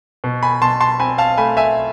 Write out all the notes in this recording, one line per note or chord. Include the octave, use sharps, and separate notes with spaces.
B2
G#5 B5
B2 A5 C6
A5 C6
C4 G#5 B5
F5 A5
A3 G#5 B5
E5 G#5